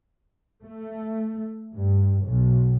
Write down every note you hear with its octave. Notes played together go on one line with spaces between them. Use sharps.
A3
G2
B1